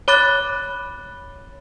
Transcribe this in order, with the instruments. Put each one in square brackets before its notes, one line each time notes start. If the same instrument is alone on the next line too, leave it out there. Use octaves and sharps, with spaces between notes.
[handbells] C#5 B5 D6 F#6 A6